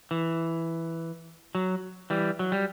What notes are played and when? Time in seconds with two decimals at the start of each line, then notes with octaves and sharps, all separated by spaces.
0.11 E3
1.55 F#3
2.10 E3 G3
2.39 F#3
2.52 G3